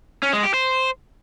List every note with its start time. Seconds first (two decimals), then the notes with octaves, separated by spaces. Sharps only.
0.23 C#4
0.33 G#3
0.43 G4
0.54 C5